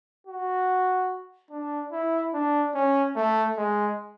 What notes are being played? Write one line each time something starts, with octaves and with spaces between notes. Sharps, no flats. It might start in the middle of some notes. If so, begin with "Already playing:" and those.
F#4
D4
E4
D4
C#4
A3
G#3